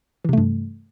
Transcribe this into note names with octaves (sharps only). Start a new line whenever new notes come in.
G2 C3 E3 A3